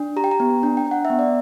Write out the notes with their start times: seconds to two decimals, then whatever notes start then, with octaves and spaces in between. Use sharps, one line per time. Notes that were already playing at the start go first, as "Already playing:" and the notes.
Already playing: D4
0.16 G4 A#5
0.24 G5
0.31 A#5
0.40 B3
0.63 D4
0.77 G5
0.86 D4 F#5
1.05 E5
1.10 B3
1.19 D5